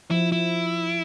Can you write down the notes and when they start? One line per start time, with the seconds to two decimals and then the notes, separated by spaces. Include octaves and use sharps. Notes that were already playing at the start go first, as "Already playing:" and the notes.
0.11 F3 E4
0.32 E4